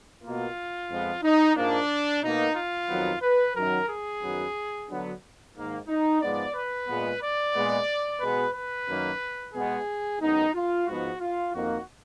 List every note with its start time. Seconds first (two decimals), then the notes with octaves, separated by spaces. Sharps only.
0.23 B2 A#3 F4
0.89 F2 F3 G#3 B3
1.23 D#4
1.56 G#2 F3 A#3 D4
2.23 B2 A#3 D#4
2.56 F4
2.89 F2 D#3 F#3 B3
3.23 B4
3.56 F#2 D#3 F#3 A#4
3.89 G#4
4.22 F#2 D#3 F#3 B3
4.89 D3 F#3 B3
5.56 G#2 D#3 A#3
5.88 D#4
6.22 G#2 F3 G#3 B3 D5
6.55 B4
6.88 A#2 G#3 B3
7.22 D5
7.55 A#2 G#3 B3
8.21 B2 G#3 B3 B4
8.55 B4
8.87 F#2 D#3 F#3 A#3
9.54 B2 G#3 B3 G#4
10.20 F#2 D#3 G#3 B3 D#4
10.55 F4
10.87 G#2 F3 B3 F#4
11.20 F4
11.53 F2 D#3 A#3 F#4